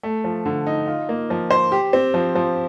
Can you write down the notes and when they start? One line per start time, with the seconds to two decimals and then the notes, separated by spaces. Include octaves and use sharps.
0.03 A3
0.24 F3
0.46 D3
0.67 D#4
0.87 F4
1.09 A#3
1.30 F3
1.51 C5
1.72 G4
1.93 C4
2.14 F3
2.35 F3